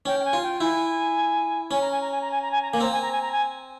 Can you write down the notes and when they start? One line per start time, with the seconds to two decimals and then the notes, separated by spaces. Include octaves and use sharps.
0.06 C#4 G5
0.19 G5
0.24 G#5
0.33 F4
0.43 G5
0.61 E4 G#5
1.71 C#4 G#5
1.81 A#5
1.91 G#5
2.01 A#5
2.11 G#5
2.21 A#5
2.31 G#5
2.41 A#5
2.51 G#5
2.62 A#5
2.71 A#3 G#5
2.81 C4 A#5
2.92 G#5
3.01 A#5
3.12 G#5
3.22 A#5
3.32 G#5